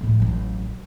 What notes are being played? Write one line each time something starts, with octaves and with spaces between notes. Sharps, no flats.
A2 F3
A1 F#3